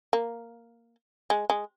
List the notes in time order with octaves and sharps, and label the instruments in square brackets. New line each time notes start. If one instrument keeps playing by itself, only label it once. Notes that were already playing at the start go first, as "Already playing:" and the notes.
[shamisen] A#3
G#3
G#3